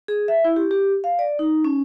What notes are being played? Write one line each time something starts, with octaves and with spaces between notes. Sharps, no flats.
G#4
E5
E4
G4
G4
F5
D5
D#4
C#4